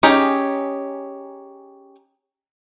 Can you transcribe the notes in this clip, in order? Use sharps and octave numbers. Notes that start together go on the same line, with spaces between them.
C#4 D#4 G4 G#4